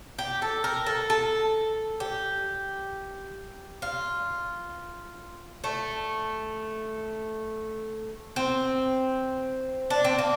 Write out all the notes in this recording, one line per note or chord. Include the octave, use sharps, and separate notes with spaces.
G4
A4
A#4
A4
A4
G4
F4
A3
C4
D4
C4
A#3